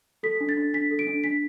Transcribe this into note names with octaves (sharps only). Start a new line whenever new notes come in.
A4 B6
D4
A6
D4
D4 B6
A4
D7
D4
D4 B6